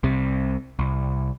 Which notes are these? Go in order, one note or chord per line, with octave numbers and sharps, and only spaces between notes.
C2 C3
C2